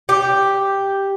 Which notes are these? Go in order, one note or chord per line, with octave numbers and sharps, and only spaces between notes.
G4